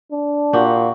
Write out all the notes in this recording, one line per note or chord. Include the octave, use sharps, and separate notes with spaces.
D4
A#2 F#4 G4